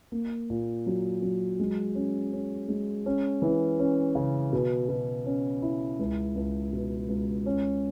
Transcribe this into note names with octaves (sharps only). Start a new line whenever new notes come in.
A#3
A#2
F#3
F#3
G#3
C#4
C#4
G#3
C#4
E3
C#4
C#3
B2
B2
C#4
E4
C#2
C#2
B2
C#2
C#4